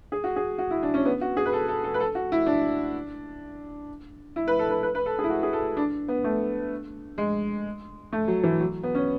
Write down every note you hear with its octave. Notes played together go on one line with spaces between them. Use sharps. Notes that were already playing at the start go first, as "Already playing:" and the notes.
G#4
F#4
G#4
F#4
E4
D4
C#4
B3
F#4
G#4
B4
A4
A4
A4
B4
A4
F#4
E4
D4
E4
B4
A4
B4
B4
B4
A4
G#4
E4
F#4
G#4
A4
D4
B3
A3
G#3
A3
F#3
E3
F#3
B3
C#4